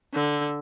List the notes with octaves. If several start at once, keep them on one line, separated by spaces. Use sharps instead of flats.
D3